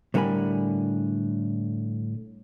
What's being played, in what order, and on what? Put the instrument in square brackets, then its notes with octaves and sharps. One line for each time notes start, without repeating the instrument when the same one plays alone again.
[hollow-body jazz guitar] A2 D3 G3 A#4 G#5 B5